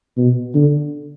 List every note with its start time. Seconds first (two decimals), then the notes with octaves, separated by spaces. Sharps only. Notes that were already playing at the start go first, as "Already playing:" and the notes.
0.17 B2
0.54 D3